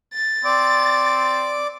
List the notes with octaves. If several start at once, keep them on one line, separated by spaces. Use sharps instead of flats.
A6
C4 D5 D6